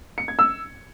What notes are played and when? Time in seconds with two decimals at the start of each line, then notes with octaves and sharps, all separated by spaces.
0.18 C#7
0.28 G#6
0.39 E6